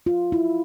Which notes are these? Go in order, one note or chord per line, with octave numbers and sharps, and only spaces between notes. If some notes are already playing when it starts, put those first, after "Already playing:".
F4
E4